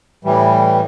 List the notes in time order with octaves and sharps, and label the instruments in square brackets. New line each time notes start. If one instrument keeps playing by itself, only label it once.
[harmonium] A2 E3 G3